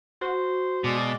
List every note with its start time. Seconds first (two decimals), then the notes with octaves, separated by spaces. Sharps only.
0.21 F#4 C5
0.84 B2 G#3 D5